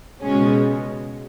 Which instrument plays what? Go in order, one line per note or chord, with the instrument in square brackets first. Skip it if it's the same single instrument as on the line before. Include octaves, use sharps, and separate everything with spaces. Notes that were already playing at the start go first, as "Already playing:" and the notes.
[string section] C#2 B2 G#3 C#4